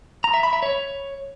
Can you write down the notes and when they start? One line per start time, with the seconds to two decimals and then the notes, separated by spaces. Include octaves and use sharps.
0.24 A#5
0.34 E5
0.43 B5
0.53 E5
0.62 C#5